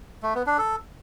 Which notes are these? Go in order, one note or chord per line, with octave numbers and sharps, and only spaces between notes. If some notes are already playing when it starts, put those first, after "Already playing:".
A3
B3
D4
A4